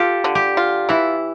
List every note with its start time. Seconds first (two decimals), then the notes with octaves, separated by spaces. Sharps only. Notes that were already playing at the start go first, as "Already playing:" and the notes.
Already playing: F4 G4 A4
0.24 D3
0.35 G4
0.57 F4
0.89 E3 E4